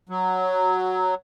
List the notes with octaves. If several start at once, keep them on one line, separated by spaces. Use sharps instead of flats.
F#3